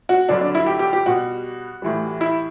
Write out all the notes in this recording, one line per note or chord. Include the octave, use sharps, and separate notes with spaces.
F#4
G2 D3 F#3 D4
D4
E4
G4
G4
G4
B2 G3 F#4
A2 E3 G3
E4